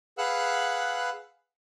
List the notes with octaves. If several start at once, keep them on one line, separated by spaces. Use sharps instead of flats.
G#4 B4 F5 F#5 E6 F#6